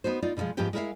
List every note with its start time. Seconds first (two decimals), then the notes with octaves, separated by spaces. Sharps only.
0.04 B3 D#4 F#4 C5
0.22 D#4 F4 D5
0.37 B2 D3 D#3 F3 G#3
0.57 G#2 F3 B3 G4 B4 G5
0.73 G#3 E4 A#4 C#5 E5 F5